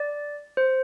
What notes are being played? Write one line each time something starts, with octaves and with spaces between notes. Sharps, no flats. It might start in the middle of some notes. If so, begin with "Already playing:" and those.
Already playing: D5
C5